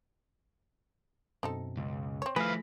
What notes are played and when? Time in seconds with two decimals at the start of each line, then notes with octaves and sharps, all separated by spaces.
1.43 F#2 B2 C4 D#4 A4
1.77 C#2
2.22 C4 C#5
2.36 F3 A3 E4 G#4 B4 F5 A#6 B6